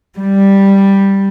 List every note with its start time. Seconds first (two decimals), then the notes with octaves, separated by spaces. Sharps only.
0.16 G3